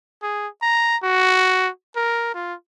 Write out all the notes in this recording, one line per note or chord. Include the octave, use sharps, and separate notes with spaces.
G#4
A#5
F#4
A#4
F4